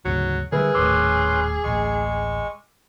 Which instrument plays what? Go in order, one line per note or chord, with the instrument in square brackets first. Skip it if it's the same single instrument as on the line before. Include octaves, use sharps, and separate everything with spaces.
[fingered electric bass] D2 G#2 C#3 [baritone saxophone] F#3
[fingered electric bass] D3 E3 G3 [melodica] E4 [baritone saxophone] G#4 [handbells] A#4 B4
[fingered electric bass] D#1 D#2 A2 [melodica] C#4 B4 C6 [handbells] D6 E6
[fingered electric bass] D1 A1 [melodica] G#3 C#6